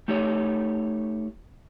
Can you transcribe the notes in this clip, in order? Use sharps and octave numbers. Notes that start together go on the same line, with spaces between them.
A3 D#4 G4 A4 C#5